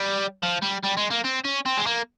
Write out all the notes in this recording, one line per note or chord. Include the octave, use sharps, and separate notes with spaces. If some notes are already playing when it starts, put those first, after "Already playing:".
Already playing: G3
F3
G3
G3
G#3
A#3
C4
C#4
C4
G#3
A#3